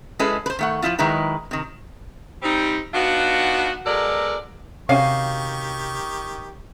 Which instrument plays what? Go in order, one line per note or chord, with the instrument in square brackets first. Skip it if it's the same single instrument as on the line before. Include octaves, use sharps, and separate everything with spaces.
[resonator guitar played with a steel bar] G#3 C#4 E4 G#4 A4 B4
B4 C5
D#3 A3 F#5
F3 C4 E4 F4
D#3 F#3 G#3 E4 B4 A#5
C3 D#3
[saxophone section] G3 C4 D#4
B3 D4 D#4 F4 F#4
B2 F#3 G#3 A4 A#4 D5
[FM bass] C3 [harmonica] D#3 G4 C#6 [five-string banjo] C#4 F#4 G#5 [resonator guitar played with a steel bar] F5